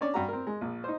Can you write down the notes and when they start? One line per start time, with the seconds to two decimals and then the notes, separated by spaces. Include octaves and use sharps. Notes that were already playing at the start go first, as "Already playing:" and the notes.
0.01 C#4 D4 C#5 D5
0.14 G2 F#4 A#5
0.28 C4 A#4
0.47 G#3
0.61 A#1
0.84 D#4 C5